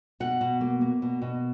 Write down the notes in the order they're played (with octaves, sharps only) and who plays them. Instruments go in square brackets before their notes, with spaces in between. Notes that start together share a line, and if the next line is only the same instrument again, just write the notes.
[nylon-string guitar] B2 F#5
B2
A#3
A#3
B2
B2